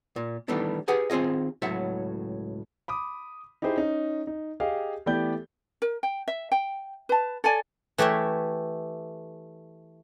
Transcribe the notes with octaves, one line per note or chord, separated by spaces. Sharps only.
A#2
D#3 E3 G3 A3 B3 D4
G4 G#4 B4 F#5 G#5
D#3 C4 F4 G#4 D#5
C#2 A2 F#3 E5 F#5
B5 D6 D#6
D#4 E4 G4 G#4 C5
C#4 D#4
D#4
G4 G#4 D#5 F5
E3 A3 B3 G4 D5 G6
A#4
G5
E5
G5
B4 A5
A4 C#5 D5 G#5
E3 A3 G4 C#5 E5